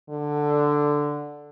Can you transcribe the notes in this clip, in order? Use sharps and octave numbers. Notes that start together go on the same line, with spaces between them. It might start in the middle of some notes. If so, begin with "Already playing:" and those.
D3